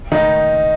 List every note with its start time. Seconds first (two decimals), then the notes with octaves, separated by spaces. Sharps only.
0.12 D#3 D#4